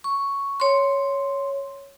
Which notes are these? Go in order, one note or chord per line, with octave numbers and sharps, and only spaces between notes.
C#6
C#5 C6